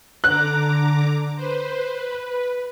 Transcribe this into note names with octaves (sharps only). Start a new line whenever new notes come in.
D3 A#5 D6 F#6
B4 C5
B4